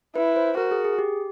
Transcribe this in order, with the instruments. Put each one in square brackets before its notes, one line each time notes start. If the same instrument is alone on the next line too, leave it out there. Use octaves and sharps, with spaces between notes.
[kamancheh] E4 [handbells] B4
[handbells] C5
[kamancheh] F#4 [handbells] A#4
[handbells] G#4
G#4
G4